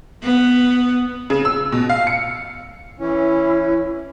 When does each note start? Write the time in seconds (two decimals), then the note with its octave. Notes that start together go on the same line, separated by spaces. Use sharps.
0.23 B3
1.30 C#3
1.45 E6
1.72 B2
1.89 F5
2.07 C#7
2.99 E3 C#4 E4